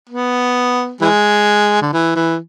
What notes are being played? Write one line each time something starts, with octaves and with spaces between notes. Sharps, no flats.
B3
E3 G#3
D3
E3
E3